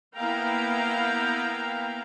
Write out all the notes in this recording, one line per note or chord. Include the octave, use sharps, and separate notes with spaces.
A#3 B3 E4 F5 G5 A#5